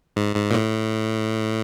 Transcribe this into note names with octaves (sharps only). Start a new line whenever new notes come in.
G#2
G#2
A#2
A2